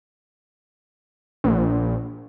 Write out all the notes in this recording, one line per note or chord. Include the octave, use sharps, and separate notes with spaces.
A#1